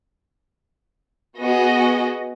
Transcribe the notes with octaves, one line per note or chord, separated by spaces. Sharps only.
B3 F#4 G#4 D#5